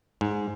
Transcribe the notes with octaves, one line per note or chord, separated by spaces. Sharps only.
G#2